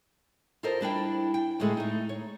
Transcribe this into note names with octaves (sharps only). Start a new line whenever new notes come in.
F4 G4 A4 A#4 C5 D#5
G3 D4 E4 G5
G5
A2 D3 G#3 G#4 A4
A3 D#4
C#5